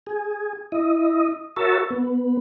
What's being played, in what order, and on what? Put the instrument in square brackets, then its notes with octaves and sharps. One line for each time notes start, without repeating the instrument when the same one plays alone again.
[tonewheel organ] G#4
E4 D#5
F#4 A#4 C#5 E5 A5
B3